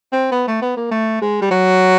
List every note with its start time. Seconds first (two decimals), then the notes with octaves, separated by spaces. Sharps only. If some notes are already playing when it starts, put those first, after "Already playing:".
0.12 C4
0.32 B3
0.48 A3
0.62 B3
0.77 A#3
0.91 A3
1.22 G#3
1.42 G3
1.51 F#3